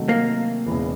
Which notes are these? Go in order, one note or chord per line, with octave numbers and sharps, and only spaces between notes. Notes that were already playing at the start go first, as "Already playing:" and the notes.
Already playing: C3 D#3 F#3 A3
A#3
E1 E2 C#3 E3